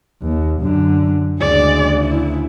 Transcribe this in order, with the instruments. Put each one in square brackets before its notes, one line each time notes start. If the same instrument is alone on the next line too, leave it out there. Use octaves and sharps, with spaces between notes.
[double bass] D#2
F#2 D3
[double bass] D2 C#3 [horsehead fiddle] G#3 D5
[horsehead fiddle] E4